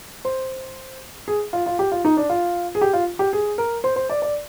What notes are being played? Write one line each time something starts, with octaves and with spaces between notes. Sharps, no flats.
C5
G#4
F4
F4
G4
F4
D#4
D4
F4
G#4
G4
F4
G4
G#4
A#4
C5
C5
D5
D5